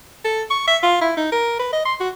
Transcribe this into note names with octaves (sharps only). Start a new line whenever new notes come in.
A4
C#6
E5
F4
E4
D#4
A#4
B4
D#5
C6
F#4